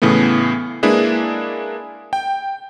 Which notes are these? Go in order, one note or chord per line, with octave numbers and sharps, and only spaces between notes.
A2 C#3 E3 A3 B3
G#3 A#3 D4 E4 G#4 B4
G5